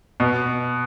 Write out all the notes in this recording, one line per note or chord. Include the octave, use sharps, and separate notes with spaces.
B2